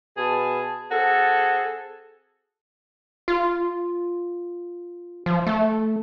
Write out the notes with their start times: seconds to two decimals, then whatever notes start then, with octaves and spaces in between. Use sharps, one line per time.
0.18 B2 G#4 A5
0.92 C4 F#4 G#4 A4
3.28 F4
5.26 F3
5.47 A3